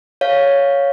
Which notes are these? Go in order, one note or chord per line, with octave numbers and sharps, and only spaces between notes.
C#5 F5